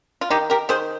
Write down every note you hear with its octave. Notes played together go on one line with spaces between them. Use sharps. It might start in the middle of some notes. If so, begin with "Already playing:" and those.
F4
D#3 D#4 G4
G4 A#4
D#3 G#4 C5